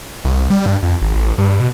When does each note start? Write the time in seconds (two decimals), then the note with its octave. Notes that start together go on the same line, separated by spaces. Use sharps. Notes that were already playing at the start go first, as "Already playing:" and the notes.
0.25 C2
0.50 G3
0.66 G2
0.83 F2
1.02 G#1
1.15 A1
1.38 G2
1.60 B2